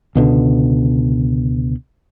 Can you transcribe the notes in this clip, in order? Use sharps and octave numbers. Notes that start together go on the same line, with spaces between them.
C#2 B2 D3